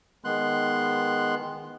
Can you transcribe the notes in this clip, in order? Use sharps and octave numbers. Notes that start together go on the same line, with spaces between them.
D#3 G#3 B3 C6 F#6